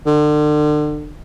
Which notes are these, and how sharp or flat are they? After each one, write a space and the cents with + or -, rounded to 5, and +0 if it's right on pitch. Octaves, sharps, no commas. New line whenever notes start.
D3 +35